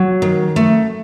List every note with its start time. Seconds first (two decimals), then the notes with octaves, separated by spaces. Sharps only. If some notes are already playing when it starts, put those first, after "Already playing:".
Already playing: F#3
0.22 D#3
0.56 A3